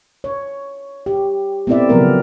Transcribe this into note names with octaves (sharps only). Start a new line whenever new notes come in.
C#5
G4
A3 B3 C4 E4 D5 E5
C#3 F3 F#3 A3 B3 A#4